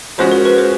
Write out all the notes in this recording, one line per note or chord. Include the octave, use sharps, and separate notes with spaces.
F3 G#3 C#4 F#4 C5
A#4
B4
C5